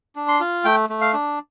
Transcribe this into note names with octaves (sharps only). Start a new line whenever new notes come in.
D4
C6
F4
A3 G5
A3
F5
D4